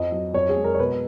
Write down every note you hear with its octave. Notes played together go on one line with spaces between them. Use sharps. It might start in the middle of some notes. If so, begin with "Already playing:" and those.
Already playing: F2 D#5
F#3
F2 C#5
G#4
G#3
A#4
C#5
B2 B4